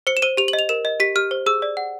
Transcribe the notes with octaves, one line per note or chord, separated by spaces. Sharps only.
C5 C#7
E7
C5 D#7
G4 F7
F#7
D#5
F7
A#4 E7
D#5
G4 B6
G4 F6
C5
G#4 E6
D5
F#5